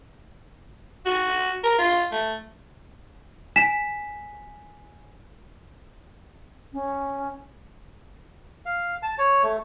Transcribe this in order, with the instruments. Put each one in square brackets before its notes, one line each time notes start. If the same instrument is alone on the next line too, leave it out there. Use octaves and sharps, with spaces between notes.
[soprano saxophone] F#4
A#4
F4
A3
[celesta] G#5 B6 E7
[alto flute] C#4
[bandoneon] F5
A5
C#5
A3